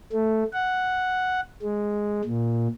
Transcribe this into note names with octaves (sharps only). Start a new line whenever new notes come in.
A3
F#5
G#3
A#2